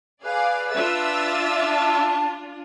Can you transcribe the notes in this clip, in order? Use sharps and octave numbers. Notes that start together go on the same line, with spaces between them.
G#4 B4 D5 F5
D4 F4 E5 E6 A6
A5